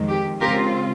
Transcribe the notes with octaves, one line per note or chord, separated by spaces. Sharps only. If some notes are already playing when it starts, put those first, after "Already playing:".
Already playing: F2 D#3 G#3
G4
C#3 G#3 C4 F4 G4 A#4